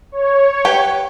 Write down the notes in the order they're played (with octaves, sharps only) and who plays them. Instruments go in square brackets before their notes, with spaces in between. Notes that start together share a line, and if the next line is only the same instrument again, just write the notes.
[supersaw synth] C#5
[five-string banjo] G4 B4 G5